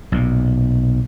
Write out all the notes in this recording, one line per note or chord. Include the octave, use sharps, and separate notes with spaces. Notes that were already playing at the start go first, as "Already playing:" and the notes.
B1 A#2